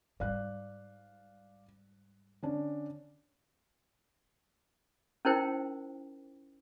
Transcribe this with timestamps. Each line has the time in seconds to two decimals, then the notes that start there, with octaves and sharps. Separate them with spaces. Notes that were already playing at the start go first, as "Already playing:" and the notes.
0.20 G#2 G3 D5 F5 F#6
2.43 D3 C#4 D4
5.25 C#4 D#4 E4 A#4 C5 G5